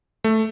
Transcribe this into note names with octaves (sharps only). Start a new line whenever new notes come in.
A3